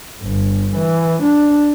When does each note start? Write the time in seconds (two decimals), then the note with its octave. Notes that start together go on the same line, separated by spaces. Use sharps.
0.22 G1
0.76 E3
1.22 D4